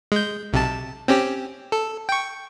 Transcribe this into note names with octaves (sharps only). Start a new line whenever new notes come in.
G#3 G6
B1 C3 A5
C4 C#4 G4
A4
G5 C#6